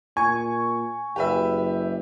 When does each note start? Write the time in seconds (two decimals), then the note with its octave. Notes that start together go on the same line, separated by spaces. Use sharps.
0.17 A#2 G#5 C#6
1.16 F#1 G4 B4 E5